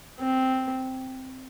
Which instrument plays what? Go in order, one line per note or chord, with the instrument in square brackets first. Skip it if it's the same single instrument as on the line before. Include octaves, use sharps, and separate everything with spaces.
[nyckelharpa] C4